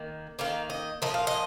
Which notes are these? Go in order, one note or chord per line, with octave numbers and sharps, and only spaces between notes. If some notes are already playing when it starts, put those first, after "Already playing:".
Already playing: D#3 A#3
D#3 A#3 F5
D#5
A#2 F3 D#5
F5
D#5